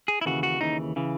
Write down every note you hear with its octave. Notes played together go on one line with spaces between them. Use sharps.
G#4
E4
D#2 C#3 E3 F#4
F#4
D#2 C#3 E3 D#4
C#3 E3